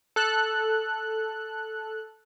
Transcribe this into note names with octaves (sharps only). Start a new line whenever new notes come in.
A4 F#6